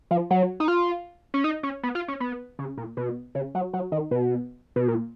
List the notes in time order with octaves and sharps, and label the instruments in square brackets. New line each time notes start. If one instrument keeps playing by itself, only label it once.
[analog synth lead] F3
F#3
D#4
F4
C#4
D#4
C#4
B3
F4
C#4
B3
C#3
A#2
B2
C#3
F#3
F#3
D#3
B2
B2
A#2